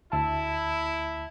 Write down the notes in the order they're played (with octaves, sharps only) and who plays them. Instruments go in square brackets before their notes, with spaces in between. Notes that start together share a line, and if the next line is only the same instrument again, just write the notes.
[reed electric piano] D2 A5 [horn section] E4